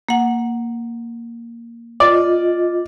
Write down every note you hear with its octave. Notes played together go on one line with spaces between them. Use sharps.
A#3 F#5
F4 D5 D#5